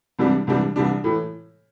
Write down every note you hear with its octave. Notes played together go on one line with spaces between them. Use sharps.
C2 C3 E3 G3 D4
C2 C3 E3 G3 D4
C2 C3 E3 G3 D4
A2 E3